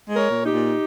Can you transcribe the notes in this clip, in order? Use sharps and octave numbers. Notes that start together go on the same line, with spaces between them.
G#3
A#4 C#5
A#2
D#4 G4
A#2